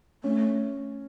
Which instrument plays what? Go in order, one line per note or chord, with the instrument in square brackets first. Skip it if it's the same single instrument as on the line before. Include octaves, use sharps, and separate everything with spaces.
[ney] A3 [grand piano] C#4